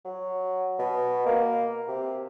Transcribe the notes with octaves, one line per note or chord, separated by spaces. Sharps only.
F#3
B2
A#3
C3